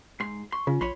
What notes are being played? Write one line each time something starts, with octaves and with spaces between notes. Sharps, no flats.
G#2 C6
C6 C#6
C#3 C#4 F4
A#1 C#5 B5 C6